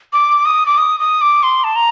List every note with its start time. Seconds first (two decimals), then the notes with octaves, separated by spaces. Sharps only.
0.13 D6
0.46 D#6
0.66 D6
0.78 D#6
1.00 D#6
1.21 D6
1.43 C6
1.64 A5
1.76 A#5